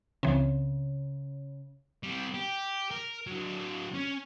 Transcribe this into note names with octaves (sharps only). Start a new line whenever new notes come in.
C#2 C#3 E3 C4
G3 C4
G4
A#4
D3 F#3
C#4